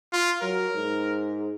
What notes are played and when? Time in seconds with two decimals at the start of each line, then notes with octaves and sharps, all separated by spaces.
0.13 F4
0.42 F#3 A#4
0.75 G#2